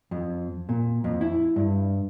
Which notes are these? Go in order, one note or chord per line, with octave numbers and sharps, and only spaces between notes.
F2
A#2
F2
E4
G2